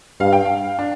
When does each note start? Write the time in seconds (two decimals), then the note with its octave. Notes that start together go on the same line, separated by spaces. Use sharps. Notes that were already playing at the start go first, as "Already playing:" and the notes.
0.20 G2 F5
0.33 G5
0.45 F5
0.79 D4